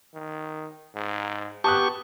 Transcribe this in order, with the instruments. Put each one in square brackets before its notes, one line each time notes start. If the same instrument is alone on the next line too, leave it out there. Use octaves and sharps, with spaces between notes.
[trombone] D#3
G#2
[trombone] B3 [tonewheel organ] G4 C#6 [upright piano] A5 D#6 F#6